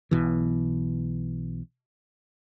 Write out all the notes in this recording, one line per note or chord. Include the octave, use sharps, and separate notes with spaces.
B1 B2 E3